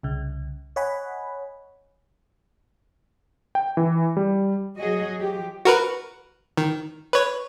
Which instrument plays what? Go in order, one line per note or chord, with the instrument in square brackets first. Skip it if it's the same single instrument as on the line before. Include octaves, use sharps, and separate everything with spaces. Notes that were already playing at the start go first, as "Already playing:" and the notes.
[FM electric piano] C2 C#3
C#5 D#5 F#5 G#5 B5
[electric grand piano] G5
E3
G3
[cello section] F#3 F#4 G#4 D#5
F3 G4
[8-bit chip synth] F#4 A#4 B4
D#3
B4 C#5